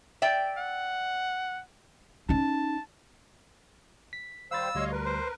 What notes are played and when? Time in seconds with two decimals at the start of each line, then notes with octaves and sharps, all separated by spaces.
0.22 D5 E5 G5
0.58 F#5
2.29 C#4 D#4 A5
4.13 B6
4.51 D#3 G3 C5 F5 B5 E6 A6
4.75 D2 G3 C#5 D#5 F5 C6
4.92 A#4 B4
5.06 C5